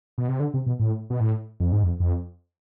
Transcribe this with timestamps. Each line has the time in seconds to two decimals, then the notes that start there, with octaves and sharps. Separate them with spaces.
0.18 B2
0.29 C3
0.40 D3
0.54 C3
0.66 B2
0.80 A2
1.10 B2
1.20 A2
1.60 F2
1.72 G#2
1.83 F2
2.00 F2